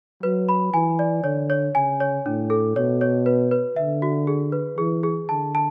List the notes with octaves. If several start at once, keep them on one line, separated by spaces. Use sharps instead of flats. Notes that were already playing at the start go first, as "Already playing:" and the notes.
F#3 B4
B5
E3 G#5
D5
D3 C#5
C#5
C#3 G#5
C#5
A2 D4
A4
B2 C#5
C#5
B4
B4
D3 E5
F#4
G#4
B4
E3 G#4
G#4
D3 A5
A5